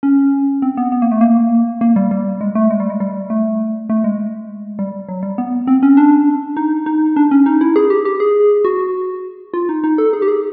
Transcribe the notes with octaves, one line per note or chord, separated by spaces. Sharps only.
C#4
C4
B3
B3
A#3
A3
A#3
A#3
G3
G3
G#3
A3
G#3
G3
G#3
G3
A3
A3
G#3
G3
F#3
G3
B3
C4
C#4
D4
D#4
D#4
D4
C#4
D#4
E4
G#4
G4
G4
G#4
F#4
F4
D#4
D#4
A4
G#4
G4
G#4